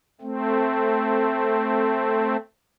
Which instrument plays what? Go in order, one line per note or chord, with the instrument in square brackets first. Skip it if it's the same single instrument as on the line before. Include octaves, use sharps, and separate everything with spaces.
[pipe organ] A3 C4